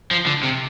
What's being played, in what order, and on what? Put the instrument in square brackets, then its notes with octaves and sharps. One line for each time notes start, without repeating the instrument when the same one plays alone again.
[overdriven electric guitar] F3
D3
C3